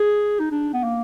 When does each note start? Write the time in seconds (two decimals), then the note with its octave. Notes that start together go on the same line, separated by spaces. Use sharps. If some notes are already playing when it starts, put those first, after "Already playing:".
Already playing: G#4
0.40 D#4
0.51 D4
0.73 B3
0.84 A#3